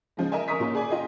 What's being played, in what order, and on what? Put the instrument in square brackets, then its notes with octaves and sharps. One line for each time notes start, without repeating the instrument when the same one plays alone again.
[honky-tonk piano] C#3 F3 G#3
A#4 D#5 E5 G#5
A#4 A#5 C#6 D#6 B6
A#2 C#4 F4
G#4 D5 G#5
F4 D#5 G5